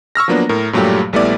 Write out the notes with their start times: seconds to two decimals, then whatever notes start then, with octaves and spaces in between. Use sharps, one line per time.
0.15 C#6 E6 F6 A#6
0.28 F3 F#3 A#3 B3 D4
0.49 A2 A#4
0.73 G2 A#2 F#3 G3 A3 G4
1.13 A#1 G3 A3 B3 E4 D5